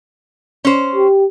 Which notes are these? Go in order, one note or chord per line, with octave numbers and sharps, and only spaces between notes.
C#4 C5
G4